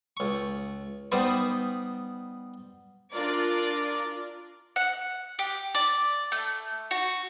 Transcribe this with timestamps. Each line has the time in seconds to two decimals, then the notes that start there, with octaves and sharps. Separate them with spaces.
0.17 C#2 C#6
1.12 G3 B3 D#4 B4 C5 D5
3.13 D4 F4 A#4 D5 D6
4.76 F#5
5.39 G4
5.75 D5
6.32 A3
6.91 F#4